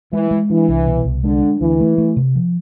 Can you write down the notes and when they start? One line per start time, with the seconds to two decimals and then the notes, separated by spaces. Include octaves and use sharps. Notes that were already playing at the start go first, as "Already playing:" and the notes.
0.13 E3 G#3
0.31 G#3
0.50 E3 D4
0.68 C2
0.87 B2
1.05 C2
1.24 D3 G#3
1.42 D4
1.61 D2 E3
1.80 A3
1.98 A3
2.17 C3
2.35 F3